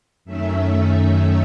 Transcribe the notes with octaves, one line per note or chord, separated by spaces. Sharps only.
F#2 D#3 A3 C#4 E5